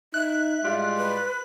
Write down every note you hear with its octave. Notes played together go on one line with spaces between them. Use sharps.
D#4 E5 F#6
A2 G3 G#3 F4
B4